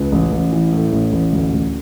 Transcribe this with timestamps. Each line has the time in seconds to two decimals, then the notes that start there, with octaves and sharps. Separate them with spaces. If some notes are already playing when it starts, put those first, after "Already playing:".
Already playing: C#2 B4
0.12 A1
0.32 A1
0.52 E3
0.73 A2
0.92 A1
1.13 A1
1.33 D2
1.53 D2